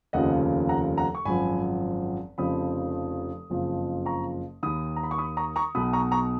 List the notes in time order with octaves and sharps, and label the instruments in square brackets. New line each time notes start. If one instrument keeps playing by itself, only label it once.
[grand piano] F1 D#2 C#3 F3 D#5 F#5
F#5 A#5
F#5 A#5
C#6
G#1 F#2 F3 G#5 B5
F1 F2 C#3 F3 B5 D#6
F#1 F2 C#3 F3
A#5 C#6
D#2 D#3 B5 D#6
A#5
B5
C#6
B5 D#6
A#5 C#6
A#5 C#6
B1 B2 B5 D#6
A#5 C#6
A#5 C#6